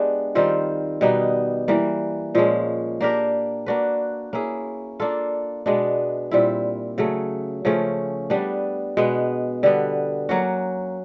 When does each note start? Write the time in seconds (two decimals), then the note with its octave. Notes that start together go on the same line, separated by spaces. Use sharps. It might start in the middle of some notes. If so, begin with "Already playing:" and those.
Already playing: G#3 B3 D4 G4
0.35 D#3 G3 C4 F4
1.01 B2 G3 B3 D#4
1.68 E3 G3 A#3
2.35 A#2 F3 G#3 C#4
3.01 A#3 D4 G4 A#4
3.66 A#3 D4 F#4 B4
4.33 A#3 C#4 E4 G#4
5.00 A#3 D4 F4 A4
5.66 B2 G#3 B3 D4
6.31 A#2 G3 C4 E4
6.98 C#3 F#3 A3
7.65 C#3 F3 A3 C#4
8.30 G3 B3 D4
8.97 B2 G#3 B3
9.63 D3 G3 B3
10.29 F#3 A#3 C#4 F#4